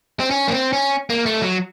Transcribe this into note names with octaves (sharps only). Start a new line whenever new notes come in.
C4
C#4
A#3
C4
C#4
A#3
A3
F#3